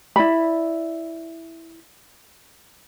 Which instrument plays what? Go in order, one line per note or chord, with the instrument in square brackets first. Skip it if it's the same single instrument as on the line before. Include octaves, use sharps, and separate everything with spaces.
[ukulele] E4 D5 B5